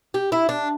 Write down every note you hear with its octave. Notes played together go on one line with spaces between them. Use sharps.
G4
E4
D4